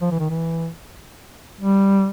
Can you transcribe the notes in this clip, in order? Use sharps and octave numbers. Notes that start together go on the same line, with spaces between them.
F3
E3
D#3
E3
G3